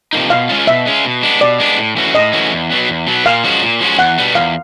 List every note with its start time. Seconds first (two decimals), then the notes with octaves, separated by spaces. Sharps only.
0.13 C3 F3 A#3 D#4
0.30 B2 F5
0.49 G#3 C#4 F4
0.67 B2 E5
0.86 G#3 C#4 F4
1.05 B2
1.23 G#3 B3 D4
1.41 B2 D5
1.60 G#3 B3 D4
1.78 A2
1.96 E3 A3 C#4 F#4
2.15 A2 D#5
2.33 E3 A3 C#4 F#4
2.52 E2
2.70 B2 F#3 B3
2.89 E2
3.07 B2 F#3 B3
3.25 A#2 F5
3.44 F3 G#3 C#4 F#4
3.62 A#2
3.81 F3 G#3 C#4 F#4
3.99 E2 F#5
4.18 B2 G3 B3
4.35 E2 F5